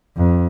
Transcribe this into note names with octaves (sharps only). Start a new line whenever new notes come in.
F2